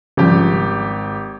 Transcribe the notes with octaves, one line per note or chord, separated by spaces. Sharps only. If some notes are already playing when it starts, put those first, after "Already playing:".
G#1 C#3 F3 G3 G4